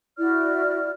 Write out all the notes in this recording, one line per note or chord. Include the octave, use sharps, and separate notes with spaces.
E4 F#4 D5 F6